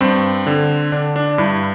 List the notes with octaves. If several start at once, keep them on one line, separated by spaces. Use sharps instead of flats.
G2 C4
D3
D3 D4
D4
G2 E4